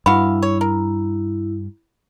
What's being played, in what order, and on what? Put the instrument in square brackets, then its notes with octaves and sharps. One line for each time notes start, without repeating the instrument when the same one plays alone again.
[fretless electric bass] G2 [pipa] E3 F#4 F5 [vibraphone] E4 [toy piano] B5
[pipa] C#5
A#4